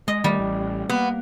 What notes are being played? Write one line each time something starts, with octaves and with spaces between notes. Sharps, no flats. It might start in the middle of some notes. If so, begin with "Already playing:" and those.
G#3 D#5
D#3 G3 A3
A1
A#3 B3